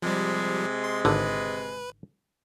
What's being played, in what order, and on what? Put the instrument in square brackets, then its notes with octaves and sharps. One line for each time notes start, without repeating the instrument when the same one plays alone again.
[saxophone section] C3 G#3 [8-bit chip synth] F3 G3
[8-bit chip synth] C6
[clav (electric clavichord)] G#1 D3 [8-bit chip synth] B4